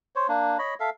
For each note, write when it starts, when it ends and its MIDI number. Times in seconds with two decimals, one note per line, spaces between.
0.16 0.27 72
0.16 0.27 73
0.28 0.58 58
0.28 0.58 62
0.59 0.74 73
0.59 0.74 75
0.59 0.74 83
0.80 0.90 69
0.80 0.90 76
0.80 0.90 77